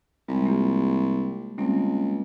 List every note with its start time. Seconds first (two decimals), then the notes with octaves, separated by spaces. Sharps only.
0.28 C2 G3 G#3
0.46 A#3 F4 G4
1.58 C#2 G3 A#3 C4